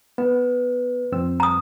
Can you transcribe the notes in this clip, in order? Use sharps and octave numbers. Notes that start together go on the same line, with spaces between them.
B3 B4
F2 C4 E6
A#5 D#6